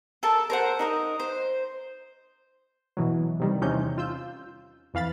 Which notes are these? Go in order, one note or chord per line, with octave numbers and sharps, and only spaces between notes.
A4 A#4 A5
A#4 C5 F#5
D#4 A#4 D5 D#5
C5
B2 E3 F#3
C3 D#3 G3
E2 C3 C#4 D#4 G6
F4 E6 G6
F2 E3 F5 B5 A6